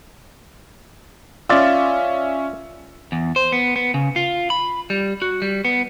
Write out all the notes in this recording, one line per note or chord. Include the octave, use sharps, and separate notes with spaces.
C#4 F4 D5 E5 E6
E2
C5
B3
B3
C#3
F4
B5
G3
F#4
G3
B3